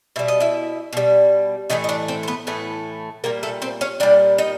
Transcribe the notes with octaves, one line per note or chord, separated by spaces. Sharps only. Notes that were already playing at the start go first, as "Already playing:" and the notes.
B2 G3 E5
D#5
E4 E5
B2 G3
A2 E3 A3 D#4 D#5
D#5
D4 D5
C4 C5
C5
B3 B4
A2 E3 A3 B3 B4
A#2 G3 A#3 A#4
A3 A4
C4 C5
C#4 C#5
A#2 G3 D4 D5
D#4 D#5